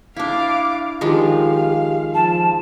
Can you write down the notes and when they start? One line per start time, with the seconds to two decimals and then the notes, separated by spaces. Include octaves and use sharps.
0.17 D4 E4 F5 D6
1.01 D#3 F3 G#3 G4 F5
2.15 F3 A5